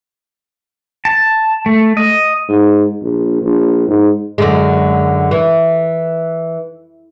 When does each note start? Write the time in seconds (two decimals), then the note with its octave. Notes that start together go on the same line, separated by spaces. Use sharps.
1.05 A5
1.66 A3
1.97 D#5
2.49 G#2
3.02 A#1
3.42 A#1
3.88 G#2
4.38 F#2 D3 G#3
5.31 E3